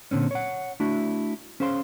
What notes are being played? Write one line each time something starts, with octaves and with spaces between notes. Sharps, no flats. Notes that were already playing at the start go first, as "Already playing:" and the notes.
A#2 D3 C4 C#4
C#5 F#5
A3 D4 E4 F#4
C#4 G#4 C5 F5 C6